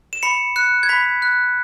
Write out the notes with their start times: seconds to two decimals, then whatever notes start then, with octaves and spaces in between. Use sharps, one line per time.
0.13 E7
0.23 B5 C#7
0.56 F#6 C#7
0.83 G#6
0.89 B5 B6
1.22 F#6